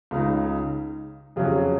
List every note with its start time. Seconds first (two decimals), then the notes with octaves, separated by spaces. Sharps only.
0.11 C#2 C#3 G#3 D#4
1.36 F2 C#3 F#3 C#4 F#4